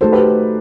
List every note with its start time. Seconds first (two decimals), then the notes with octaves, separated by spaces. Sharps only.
0.01 A3 D#4 F#4 A4 C5
0.12 G4 B4